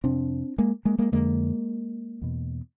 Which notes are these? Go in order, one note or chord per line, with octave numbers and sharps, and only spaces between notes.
F2 C3 C4 D4
G#3 A#3
G#3 A#3
G#3 A#3
F2 D3 G#3 A#3
E2 B2